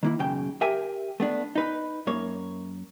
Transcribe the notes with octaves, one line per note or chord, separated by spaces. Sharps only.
D#3 A#3 E4
B1 F#2 C#3 G5
G4 A#4 E5 G5 G#5
A3 B3 D4
D#4 B4
F#2 A#3 C#5